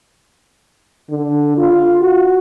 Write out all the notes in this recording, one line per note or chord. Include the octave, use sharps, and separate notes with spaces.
D3
F4
F#4